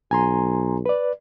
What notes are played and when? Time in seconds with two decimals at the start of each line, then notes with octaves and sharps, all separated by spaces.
0.11 B1 G#5 A#5 C6
0.86 B4 D5